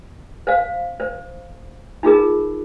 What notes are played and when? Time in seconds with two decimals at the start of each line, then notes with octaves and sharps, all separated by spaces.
0.47 C5 F5
1.00 C5
2.03 D#4 F4 G#4 A#4